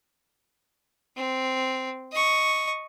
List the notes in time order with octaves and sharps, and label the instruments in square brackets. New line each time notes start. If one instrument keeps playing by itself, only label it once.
[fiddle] C4
D#5 C#6